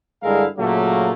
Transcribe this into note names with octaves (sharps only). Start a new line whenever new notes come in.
G2 D3 G#3 E4 A#4 F5
A#2 C#3 F#3 A3 A#3